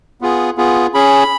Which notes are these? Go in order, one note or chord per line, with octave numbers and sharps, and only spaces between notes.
B3 F4 G#4
B3 F4 G#4
C#4 G#4 B5